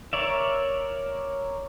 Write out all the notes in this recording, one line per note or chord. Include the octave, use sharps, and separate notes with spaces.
A#4 C#5 D5 E5